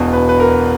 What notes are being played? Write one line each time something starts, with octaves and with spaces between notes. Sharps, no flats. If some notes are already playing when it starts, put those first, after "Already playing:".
Already playing: E1 E2 B2
B4
B4
A#4